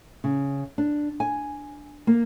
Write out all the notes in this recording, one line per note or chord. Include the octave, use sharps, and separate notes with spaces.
C#3
D4
G#5
A#3